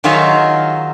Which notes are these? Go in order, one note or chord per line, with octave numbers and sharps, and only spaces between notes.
D#3 F#3 F4 G#4 E5 F5